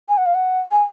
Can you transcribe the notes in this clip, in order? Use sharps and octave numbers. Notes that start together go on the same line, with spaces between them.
G#5
F#5
F5
F#5
G#5